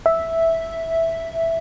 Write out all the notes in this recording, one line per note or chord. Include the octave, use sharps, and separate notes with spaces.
E5